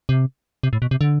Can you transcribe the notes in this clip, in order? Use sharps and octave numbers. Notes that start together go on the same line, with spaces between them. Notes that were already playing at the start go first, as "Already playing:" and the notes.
C3
C3
A2
B2
C3
D3